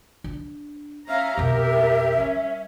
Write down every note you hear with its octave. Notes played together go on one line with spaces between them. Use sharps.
D4
C#4 E5 F5 A#5
F2 B2 G4 A#4
G3 C#4